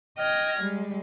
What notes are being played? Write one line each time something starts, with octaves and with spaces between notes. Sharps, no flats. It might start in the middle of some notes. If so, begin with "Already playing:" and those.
D#5 G5 F6 G#6 A#6
G3 G#3